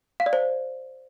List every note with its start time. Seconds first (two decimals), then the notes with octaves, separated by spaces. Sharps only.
0.20 F5
0.26 D5
0.33 C5